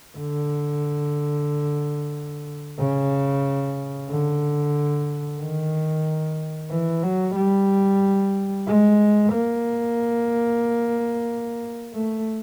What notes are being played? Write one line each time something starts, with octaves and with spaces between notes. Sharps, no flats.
D3
C#3
D3
D#3
E3
F#3
G3
G#3
A#3
A3